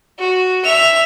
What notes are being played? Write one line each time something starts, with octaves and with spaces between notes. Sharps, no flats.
F#4
E5 F7